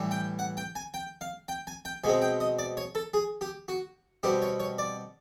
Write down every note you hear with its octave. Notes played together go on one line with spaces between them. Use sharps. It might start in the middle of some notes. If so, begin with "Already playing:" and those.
Already playing: A2 E3 G3
G5
F#5
G5
G#5
G5
F5
G5
G#5
G5
B2 G#3 C4 G#5
G5
D#5
D5
C#5
A4
G#4
G4
F#4
B2 G3 C4 G4
C#5
C#5
D5